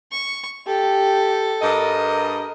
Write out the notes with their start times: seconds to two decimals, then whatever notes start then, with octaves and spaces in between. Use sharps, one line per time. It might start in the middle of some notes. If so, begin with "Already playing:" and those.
0.12 C#6
0.67 G4 A4
1.62 G2 A#4 D#5